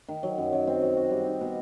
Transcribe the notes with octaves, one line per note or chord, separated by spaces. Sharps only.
D#3
F#3
F#2
F#2
C4
F#3
F#4
G3
D#4
B2